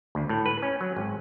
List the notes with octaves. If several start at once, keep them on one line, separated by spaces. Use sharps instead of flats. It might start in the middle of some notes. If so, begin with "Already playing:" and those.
D2
A2
B4
C#4
F#3
G#1